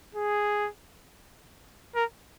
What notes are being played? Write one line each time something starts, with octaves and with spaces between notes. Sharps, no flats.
G#4
A#4